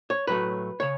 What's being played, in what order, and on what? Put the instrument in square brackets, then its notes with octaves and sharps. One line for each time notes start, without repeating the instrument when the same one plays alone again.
[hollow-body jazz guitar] C#5
A2 F#3 A3 B4
C#3 C#5